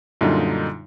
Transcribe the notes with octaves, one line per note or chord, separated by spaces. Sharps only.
F#2 A#2 D3 G3 D#4 F4